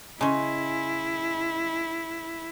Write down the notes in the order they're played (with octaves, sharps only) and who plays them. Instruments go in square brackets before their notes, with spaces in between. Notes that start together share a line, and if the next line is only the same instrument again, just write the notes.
[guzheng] C#3 C#4 [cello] E4 [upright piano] D#5 G#5 C6